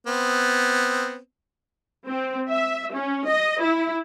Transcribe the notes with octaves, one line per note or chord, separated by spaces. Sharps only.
B3 C4
C4
E5
C#4
D#5
E4